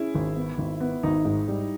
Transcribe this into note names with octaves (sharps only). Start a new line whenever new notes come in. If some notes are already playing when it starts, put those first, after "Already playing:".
Already playing: C#4 E4 G#4
G#1
B3
G#1
B3
G#1 D#4
G#2
G3